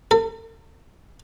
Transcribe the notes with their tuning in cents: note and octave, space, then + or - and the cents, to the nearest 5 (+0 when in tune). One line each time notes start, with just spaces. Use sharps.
A4 +40